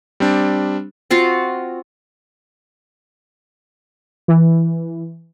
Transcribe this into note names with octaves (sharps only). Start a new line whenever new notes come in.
G3 C4 D4
C4 F4 F#4 F5
E3